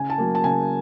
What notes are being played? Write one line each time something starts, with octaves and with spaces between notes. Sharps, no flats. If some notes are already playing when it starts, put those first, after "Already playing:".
Already playing: C#3 G#5
A5
F#3 A#3
A5
C#3 G#5